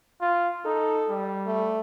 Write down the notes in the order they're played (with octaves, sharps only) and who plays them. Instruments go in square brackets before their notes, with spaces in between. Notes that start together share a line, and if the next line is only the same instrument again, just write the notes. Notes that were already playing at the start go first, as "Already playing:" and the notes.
[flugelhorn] F4
[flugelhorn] D#4 [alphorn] A4
[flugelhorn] G3
[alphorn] A3